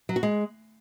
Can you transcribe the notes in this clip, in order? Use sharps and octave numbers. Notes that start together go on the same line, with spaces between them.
F#3
F#4
G#3